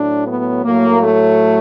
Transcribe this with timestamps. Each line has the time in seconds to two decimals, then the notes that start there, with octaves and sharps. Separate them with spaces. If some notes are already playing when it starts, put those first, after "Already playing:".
Already playing: A2 F#3 D4
0.26 B3
0.64 A2 F#3 A#3
1.03 A3